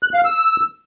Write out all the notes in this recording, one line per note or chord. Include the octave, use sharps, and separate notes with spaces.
F#6
F5
E6